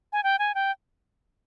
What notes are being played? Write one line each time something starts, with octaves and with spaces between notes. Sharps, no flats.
G#5
G5
G#5
G5